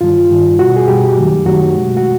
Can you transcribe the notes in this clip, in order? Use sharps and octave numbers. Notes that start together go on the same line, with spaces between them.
G2 D#3 G3 F4
G2 D#3 G3
B2 G3 F#4
G#4
B2 G3 G4
F#2 D#3 F#3 A3
F#2 D#3 F#3 A3 F#4
B2 G#3
F#4